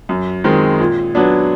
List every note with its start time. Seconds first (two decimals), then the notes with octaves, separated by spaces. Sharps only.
0.09 F#2
0.44 D#3 G#3 C4
0.80 A#2
1.15 F#3 B3 D4